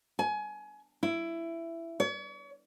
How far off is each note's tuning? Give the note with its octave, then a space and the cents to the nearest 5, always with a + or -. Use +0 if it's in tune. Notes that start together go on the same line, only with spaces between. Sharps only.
G#5 +25
E4 +15
C#5 +40